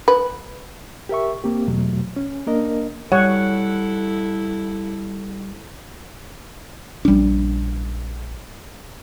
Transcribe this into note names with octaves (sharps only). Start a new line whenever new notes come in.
B4
G4 A#4 E5 C#6
A#3 C4 G4
E2 B2 F#3 A3
C#4
A#3 D4 A#4 D#5
G3 E4 A4 C#5 F#5
A#1 G3 C#4 D4